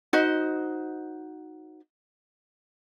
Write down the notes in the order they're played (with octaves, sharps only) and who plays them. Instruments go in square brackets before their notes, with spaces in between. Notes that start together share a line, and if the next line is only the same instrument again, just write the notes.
[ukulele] D#4 F#4 C5 D#5